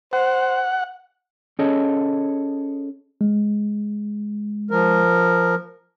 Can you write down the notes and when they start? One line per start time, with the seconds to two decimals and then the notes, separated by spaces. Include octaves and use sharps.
0.13 C5 F#5
1.59 C#4 G#4 A4 C#5 D#5
3.21 G#3
4.71 F3 A#4